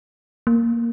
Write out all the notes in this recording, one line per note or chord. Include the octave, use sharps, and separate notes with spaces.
A#3